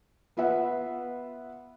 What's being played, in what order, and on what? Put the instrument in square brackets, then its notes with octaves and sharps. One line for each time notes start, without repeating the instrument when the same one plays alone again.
[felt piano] B3 F4 B4 E5 F#5